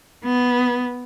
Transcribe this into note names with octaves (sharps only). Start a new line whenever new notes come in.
B3